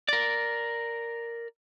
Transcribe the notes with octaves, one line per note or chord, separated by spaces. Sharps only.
A#4 D5